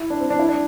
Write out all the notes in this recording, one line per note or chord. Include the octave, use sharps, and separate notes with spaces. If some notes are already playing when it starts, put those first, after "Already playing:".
Already playing: E4
D4
C4
D4
E4
D4